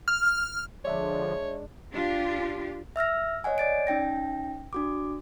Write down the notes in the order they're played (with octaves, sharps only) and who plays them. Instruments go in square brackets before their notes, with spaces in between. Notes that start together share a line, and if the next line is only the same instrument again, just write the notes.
[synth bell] F6
[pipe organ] D3 F3 [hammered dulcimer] G#3 D4 [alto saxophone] C#5 [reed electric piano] D5 E5
[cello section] D4 F4 G4
[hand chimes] E5 E6 F6 A#6
C#5 D#5 F#5 G#5
D5 A6 D7
C#4 D#4 G5 A#6
D4 F#4 D6